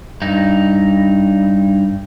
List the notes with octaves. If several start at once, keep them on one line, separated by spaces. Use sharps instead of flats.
G2 D#4